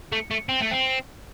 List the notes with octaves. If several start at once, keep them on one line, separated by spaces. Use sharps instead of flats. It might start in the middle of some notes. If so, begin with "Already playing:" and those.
A3
A3
C4
A3
C4